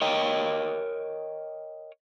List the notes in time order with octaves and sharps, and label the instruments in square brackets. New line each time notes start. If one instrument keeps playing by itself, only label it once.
[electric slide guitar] A#4 C#5 D#5 G5